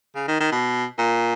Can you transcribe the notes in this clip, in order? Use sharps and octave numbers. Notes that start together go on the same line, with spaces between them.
C#3
D#3
D#3
B2
A#2